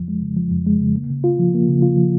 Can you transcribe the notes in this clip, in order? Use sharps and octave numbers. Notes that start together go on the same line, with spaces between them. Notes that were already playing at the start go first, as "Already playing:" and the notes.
Already playing: F2 F3
G#3
C#3
F3
F2
G#3
C#3
A#3
C#3
F4
F3
A#3
C#3
F4
F3